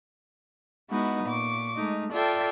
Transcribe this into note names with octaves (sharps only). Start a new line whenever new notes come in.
G#3 B3 D#4 E4 F#4
A#2 C#6 D6
G#3 A3 D#4
F4 A4 D5 E5 G5